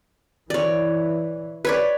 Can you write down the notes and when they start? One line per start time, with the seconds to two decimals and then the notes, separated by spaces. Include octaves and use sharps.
0.50 E3 C#5 D5
1.65 B4 C#5 D5